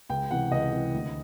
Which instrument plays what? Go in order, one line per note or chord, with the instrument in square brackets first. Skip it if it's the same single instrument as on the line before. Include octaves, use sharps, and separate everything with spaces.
[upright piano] C#2 G5
C3 E3 F#5
C#2 D#5
C3 E3
D2